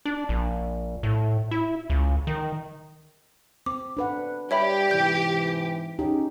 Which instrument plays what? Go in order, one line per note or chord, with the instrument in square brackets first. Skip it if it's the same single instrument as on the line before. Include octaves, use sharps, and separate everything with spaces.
[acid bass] D4
A#1
A2
E4
C#2
D#3
[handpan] C4 [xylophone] D6
[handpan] D4 B4 F#5
[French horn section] G3 D5 [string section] G4 [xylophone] C#5 E5 B5
[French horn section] G#2 C3 E3 [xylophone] G6
[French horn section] C#4 G#4 [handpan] D#4 G4